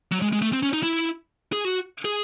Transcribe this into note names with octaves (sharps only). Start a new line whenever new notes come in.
F#3
G#3
G#3
A3
C4
C#4
D#4
E4
G#4
F#4
G#4